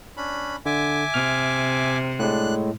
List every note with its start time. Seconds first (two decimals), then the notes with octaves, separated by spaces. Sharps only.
0.17 C#4 D4 B5
0.66 D3 E5 G#5 D6
1.14 C3 F6
2.19 A2 G#3 D4 F#6